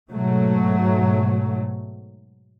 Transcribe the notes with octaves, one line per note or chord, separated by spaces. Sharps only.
G#2 B2 F#3 A3